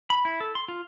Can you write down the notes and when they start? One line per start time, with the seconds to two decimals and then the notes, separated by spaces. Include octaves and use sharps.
0.10 B5
0.25 E4
0.40 A4
0.55 C6
0.68 F4